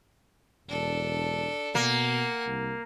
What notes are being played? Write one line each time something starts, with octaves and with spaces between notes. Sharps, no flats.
E1 D4 A4
B2 A#3 F#5 G#5
C2